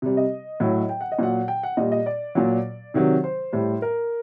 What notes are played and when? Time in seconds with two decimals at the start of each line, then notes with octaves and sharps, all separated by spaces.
0.02 C3 G3
0.17 D#5
0.60 A2 F#3
0.89 G5
1.01 F#5
1.12 D#5
1.19 A#2 F#3 F#5
1.48 G5
1.63 F#5
1.77 A#2 G3 D#5
1.92 D#5
2.06 D5
2.35 A#2 F#3
2.94 C3 D#3 F#3
3.24 C5
3.52 A2 G3
3.82 A#4